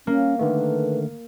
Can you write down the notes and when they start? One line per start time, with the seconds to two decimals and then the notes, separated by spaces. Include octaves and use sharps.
0.07 A#3 C#4
0.39 D3 D#3 A3 B4